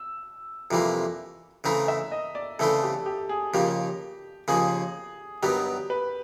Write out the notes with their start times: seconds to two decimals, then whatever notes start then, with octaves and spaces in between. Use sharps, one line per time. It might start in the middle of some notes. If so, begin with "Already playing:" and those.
Already playing: E6
0.71 F2 C3 E3 G3 A#3
1.64 C#3 E3 A3 C4 E4 A#5
1.88 E5
2.11 D#5
2.35 D5
2.59 C#3 E3 A3 C4 E4 A4
2.83 G4
3.06 G4
3.29 G#4
3.54 D#2 C#3 F3 A#3 G4
4.48 D#2 C#3 F3 A#3 G#4
5.42 G2 D#3 F#3 B3 G4
5.90 B4